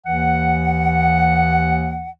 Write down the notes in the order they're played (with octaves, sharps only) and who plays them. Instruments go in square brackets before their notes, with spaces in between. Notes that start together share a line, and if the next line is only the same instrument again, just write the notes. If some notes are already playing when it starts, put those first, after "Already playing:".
[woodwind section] D#2 E3 F#5